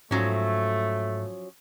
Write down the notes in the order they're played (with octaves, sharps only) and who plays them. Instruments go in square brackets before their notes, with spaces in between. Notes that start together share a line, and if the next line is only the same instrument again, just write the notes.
[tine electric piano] G#2 [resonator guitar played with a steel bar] F3 F#3 C#4 [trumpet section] A3